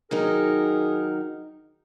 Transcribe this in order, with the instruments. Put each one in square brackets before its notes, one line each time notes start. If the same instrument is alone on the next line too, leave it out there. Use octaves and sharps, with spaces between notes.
[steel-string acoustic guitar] D#3 F#3 D#4 [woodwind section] G#4 A#4